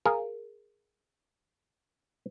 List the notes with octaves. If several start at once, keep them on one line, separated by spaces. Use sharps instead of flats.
G#4 A#4 F5 G#5